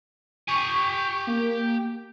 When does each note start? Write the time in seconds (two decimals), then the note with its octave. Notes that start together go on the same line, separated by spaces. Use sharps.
0.48 G4 G#5 C#6
1.27 A#3